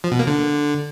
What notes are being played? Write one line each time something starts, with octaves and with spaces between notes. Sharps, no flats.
F3
B2
A#3
D3